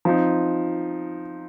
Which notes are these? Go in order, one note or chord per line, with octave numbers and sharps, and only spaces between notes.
F3 C4 D#4